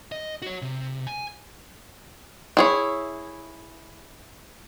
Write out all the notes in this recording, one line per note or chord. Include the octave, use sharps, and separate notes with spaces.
D#5
F#4 C#5
C3
G#5
E4 G#4 C#5